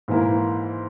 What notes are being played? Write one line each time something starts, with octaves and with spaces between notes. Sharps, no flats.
G#2 E3 A#3 E4 A#4